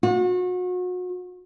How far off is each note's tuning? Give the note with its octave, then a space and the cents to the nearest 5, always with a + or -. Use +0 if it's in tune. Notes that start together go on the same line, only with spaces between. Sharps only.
F#4 -35